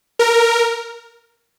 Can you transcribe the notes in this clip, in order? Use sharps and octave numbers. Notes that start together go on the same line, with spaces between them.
A#4